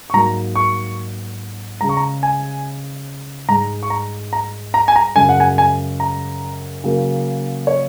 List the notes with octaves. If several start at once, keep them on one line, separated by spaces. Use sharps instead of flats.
C#6
G#2 F#3 A#3 A#5
C#6
C#3 G#3 A#5
C#6
A#5
G#5
G#2 G#3 A#5
C#6
A#5
A#5
A#5
G#5
A#5
F#2 C#3 G#3 G#5
F#5
G#5
G#5
A#5
C#3 F#3 A#3
C#5